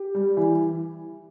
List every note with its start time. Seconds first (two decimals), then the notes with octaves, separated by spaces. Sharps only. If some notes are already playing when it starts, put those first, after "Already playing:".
Already playing: G4
0.14 G3
0.37 E3